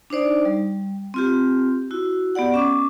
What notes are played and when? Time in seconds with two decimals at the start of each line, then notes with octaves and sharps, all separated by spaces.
0.10 D4 D#4 C5 D5
0.45 G3
1.14 C4 F4 G4
1.91 E4 F#4
2.35 B3 G4 D5 F#5
2.54 C#4 D6